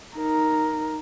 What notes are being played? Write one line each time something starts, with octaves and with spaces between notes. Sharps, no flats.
D#4 A#4